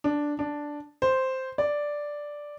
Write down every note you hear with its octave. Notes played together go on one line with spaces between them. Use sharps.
D4
D4
C5
D5